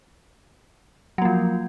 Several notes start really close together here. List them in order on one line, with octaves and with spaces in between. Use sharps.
F#3 A#3 F3